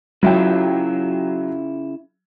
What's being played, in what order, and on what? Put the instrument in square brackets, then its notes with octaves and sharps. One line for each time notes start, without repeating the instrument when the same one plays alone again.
[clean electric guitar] C#3 E4 F4 [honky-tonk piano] F#3 G5